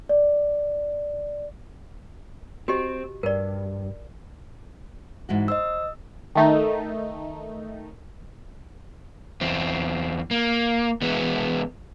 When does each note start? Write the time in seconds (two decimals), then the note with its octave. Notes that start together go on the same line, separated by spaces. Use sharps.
0.09 D5
2.68 C4 F#4 G4 D#5
3.23 G2 A#4 D5
5.29 G#2 E3 F#4
5.48 C5 D#5 E6
6.35 D#3 A3 D#4
9.41 E2 C4
10.31 A#3
11.02 E3 G#3 B3